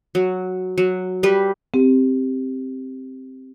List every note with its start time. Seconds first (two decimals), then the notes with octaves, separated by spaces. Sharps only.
0.15 F#3
0.78 F#3
1.23 G3 G4 B4
1.74 C4 G4